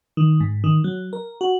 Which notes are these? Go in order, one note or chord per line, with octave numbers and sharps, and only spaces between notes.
D#3
G#2
D#3
F#3
A#4
F#4